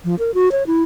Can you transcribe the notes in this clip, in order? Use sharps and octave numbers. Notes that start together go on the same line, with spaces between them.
F3
A#4
F#4
C#5
E4